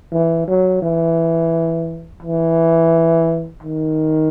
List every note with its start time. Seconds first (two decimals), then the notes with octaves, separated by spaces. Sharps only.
0.12 E3
0.47 F#3
0.82 E3
2.22 E3
3.63 D#3